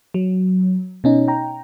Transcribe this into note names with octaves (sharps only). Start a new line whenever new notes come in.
F#3
B2 C#4 D#4
G5 A#5